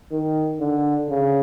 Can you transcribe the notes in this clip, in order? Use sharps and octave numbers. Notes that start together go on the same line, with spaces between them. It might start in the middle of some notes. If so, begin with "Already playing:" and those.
D#3
D3
C#3